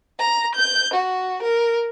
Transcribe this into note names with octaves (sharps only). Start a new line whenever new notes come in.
A#5
G6
F#4
A#4